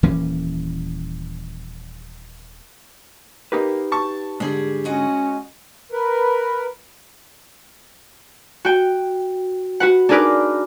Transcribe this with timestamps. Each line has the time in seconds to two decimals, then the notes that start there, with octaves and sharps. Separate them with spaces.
0.03 D#1 E3 A#3 C#4
3.52 A#3 D#4 G4 B4
3.92 A5 C#6
4.40 G#2 D3 G3 G#4
4.85 G#3 C#4 F#4 D#5
5.92 A#4 B4
8.65 F#4 G5
9.80 F#4 B4 F#5
10.09 D4 D#4 G#4 A#4 B4 D6